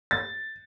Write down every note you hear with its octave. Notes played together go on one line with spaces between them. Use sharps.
A6